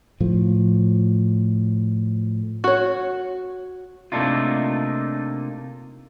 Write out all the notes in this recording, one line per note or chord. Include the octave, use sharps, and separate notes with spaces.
A2 F3
F#4 C#5
C3 A3 A#3 D4 D#4 F4